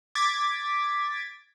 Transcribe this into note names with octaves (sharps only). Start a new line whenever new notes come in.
D6 G#6 A6 B6